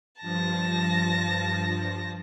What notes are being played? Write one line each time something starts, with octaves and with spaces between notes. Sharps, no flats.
G2 F3 A5 A#6